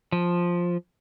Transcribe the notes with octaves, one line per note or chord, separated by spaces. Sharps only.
F3